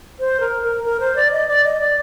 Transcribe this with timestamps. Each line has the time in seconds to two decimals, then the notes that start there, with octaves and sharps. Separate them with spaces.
0.20 C5
0.40 A#4
0.63 A#4
0.84 A#4
1.00 C5
1.16 D5
1.32 D#5
1.48 D5
1.65 D#5
1.80 D5